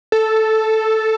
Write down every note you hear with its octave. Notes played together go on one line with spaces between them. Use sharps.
A4